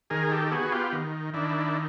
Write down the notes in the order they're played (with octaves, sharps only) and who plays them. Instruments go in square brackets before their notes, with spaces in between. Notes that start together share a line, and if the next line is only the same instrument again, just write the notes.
[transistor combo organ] D#3 G#4 A#4
G4 A4
B3 F#4 G#4
F4 G4
D#3
D#3 D4 E4